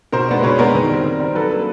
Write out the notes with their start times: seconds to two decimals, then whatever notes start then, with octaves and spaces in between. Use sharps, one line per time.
0.12 B2 A#4 C5
0.28 G#3 B3 D4
0.43 B2 B4 C#5
0.59 G#3 B3 D4 A#4
0.75 D#3
0.90 G3 C4
1.04 D#3
1.20 G3 C4
1.35 F#3 A4 B4
1.50 A#3 D4